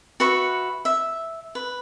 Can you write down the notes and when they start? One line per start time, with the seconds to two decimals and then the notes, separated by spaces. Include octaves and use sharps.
0.20 F#4 B4 E5 C#6
0.85 E5
1.55 B4